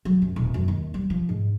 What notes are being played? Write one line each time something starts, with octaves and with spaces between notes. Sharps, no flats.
F#3
F#2
D#1
F#2
D#2
G3
F3
G#2